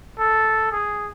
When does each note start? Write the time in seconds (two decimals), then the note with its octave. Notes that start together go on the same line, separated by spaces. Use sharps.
0.18 A4
0.72 G#4